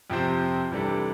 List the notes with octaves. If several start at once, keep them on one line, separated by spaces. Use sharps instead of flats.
F2 C3 F3 C4
C3 E3 G3 D4 A4